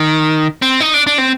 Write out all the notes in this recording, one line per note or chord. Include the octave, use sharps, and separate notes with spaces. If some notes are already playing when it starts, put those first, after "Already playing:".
Already playing: D#3
C4
D#4
D4
D4
C4